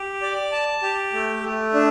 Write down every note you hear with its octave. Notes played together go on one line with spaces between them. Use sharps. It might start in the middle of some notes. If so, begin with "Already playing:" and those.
Already playing: G4
D5
A5
G4
A3
A3
D4